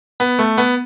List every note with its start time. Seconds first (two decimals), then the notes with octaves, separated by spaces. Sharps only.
0.20 B3
0.39 A3
0.58 B3